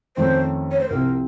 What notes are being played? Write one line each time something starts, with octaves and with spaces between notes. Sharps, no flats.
F2 D#3 A3 C#4 C5
C#5
C5
C2 C3 F3 C4 A#4